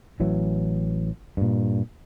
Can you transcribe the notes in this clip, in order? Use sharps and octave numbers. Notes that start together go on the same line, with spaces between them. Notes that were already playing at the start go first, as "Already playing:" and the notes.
A1 E3 F#3
G2 A#2